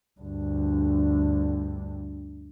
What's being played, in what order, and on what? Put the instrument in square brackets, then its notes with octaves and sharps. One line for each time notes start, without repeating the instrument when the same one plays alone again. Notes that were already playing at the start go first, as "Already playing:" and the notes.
[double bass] D2 G2